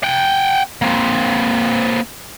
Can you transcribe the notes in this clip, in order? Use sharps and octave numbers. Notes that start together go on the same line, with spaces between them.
F#5 G5
A#3 C4